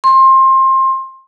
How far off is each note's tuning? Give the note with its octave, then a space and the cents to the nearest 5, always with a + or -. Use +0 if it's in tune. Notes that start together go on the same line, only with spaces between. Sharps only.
C6 +25